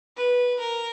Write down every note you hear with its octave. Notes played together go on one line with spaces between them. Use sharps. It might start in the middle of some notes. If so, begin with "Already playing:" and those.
B4
A#4